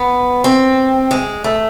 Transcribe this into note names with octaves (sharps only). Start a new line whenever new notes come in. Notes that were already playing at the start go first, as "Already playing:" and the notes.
Already playing: B3
C4
G#3
A3